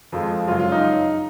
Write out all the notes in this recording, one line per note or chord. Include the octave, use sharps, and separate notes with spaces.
F2 F3 G#3
F#2 C#3 G#3 F4
F4
D#4